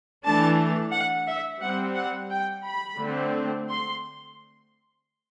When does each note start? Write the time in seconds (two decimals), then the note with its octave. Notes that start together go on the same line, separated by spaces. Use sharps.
0.24 E3 A3 D4 A5
0.93 F#5
1.28 E5
1.62 G3 C4 F#5
1.96 F#5
2.31 G5
2.65 B5
2.99 D3 A3 C4
3.69 C6